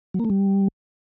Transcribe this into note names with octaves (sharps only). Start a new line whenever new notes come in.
F#3
A#3
A3
G3